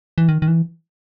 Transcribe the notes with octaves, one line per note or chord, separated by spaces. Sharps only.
E3
D#3
D#3
E3